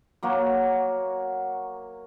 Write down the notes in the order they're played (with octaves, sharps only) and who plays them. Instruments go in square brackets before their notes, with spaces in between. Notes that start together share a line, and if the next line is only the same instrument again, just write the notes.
[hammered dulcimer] F#3 A#3 F#4